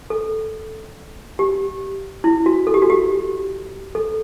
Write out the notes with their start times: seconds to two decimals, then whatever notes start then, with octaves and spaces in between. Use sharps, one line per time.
0.10 A4
1.39 G4
2.24 E4
2.46 F#4
2.67 A4
2.74 G4
2.82 F#4
2.90 G4
3.95 A4